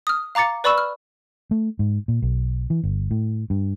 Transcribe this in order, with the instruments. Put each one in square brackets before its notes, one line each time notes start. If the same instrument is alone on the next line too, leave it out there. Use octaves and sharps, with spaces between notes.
[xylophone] D#6 F6
F5 A#5 D6 A6 C#7
B4 D5 B5 C#6 E6 E7
F6
[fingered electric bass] A3
G#2
A#2
B1
E3
G1
A2
G2